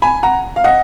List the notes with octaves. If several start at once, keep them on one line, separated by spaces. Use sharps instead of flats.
G#5 B5
F#5 A#5
F5
D#5 F#5